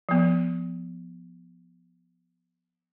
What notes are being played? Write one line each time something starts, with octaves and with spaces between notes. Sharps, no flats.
F3 B3